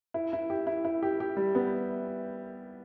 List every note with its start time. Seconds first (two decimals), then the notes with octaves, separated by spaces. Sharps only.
0.14 E4
0.33 E4
0.50 G4
0.67 E4
0.85 E4
1.03 G4
1.20 G4
1.37 G3
1.55 B3